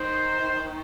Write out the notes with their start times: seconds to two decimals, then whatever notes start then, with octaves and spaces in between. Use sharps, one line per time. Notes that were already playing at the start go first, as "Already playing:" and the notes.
Already playing: D#3 C5